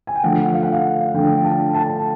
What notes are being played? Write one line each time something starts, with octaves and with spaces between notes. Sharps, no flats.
G#5
G5
D3 F3 A3 F#5
F5
F#5
F5
D3 F3 A3 G5
A5
A5